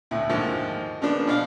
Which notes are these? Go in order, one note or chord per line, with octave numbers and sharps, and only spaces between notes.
D2 A2 E4
D#2 G#2 D3 D#3 F3
C#3 F3 A#3 B3 D4
B2 D4 F5